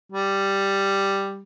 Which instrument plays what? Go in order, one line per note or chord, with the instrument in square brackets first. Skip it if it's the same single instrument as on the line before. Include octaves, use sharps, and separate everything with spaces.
[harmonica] G3